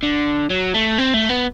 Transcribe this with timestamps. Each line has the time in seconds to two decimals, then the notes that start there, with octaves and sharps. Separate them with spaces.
0.03 D3
0.50 F#3
0.74 A3
0.98 C4
1.14 A3
1.29 B3